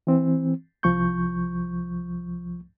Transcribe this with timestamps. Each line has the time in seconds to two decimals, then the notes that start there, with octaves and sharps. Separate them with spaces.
0.07 E3 C4
0.83 C2 F3 C#6 G6